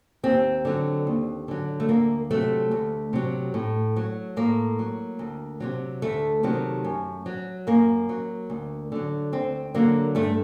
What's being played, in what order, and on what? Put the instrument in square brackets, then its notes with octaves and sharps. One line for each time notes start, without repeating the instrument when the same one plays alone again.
[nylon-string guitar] D#2 C4
D3 F#3
D#2
D3 F#3
A3
D2 A#3
C3 F#3 A3
D2
C3 F#3
A2
F#3
A2 A#3
F#3
D2
C3 D#3 F#3
D2 A3
C3 D#3 F#3
F#2
F#3
F#2 A#3
F#3
D2
D3 F#3
D2 C4
D3 F#3 A#3
G2 A3